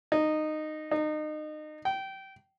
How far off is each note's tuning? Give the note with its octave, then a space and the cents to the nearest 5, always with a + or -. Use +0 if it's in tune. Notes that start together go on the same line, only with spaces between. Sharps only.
D#4 -15
D#4 -30
G5 -20